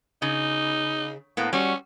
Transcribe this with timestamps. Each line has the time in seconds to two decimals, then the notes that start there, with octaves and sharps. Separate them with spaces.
0.22 C#3 D#4
1.37 A2 A#3 B3
1.53 G3 C#4 F#4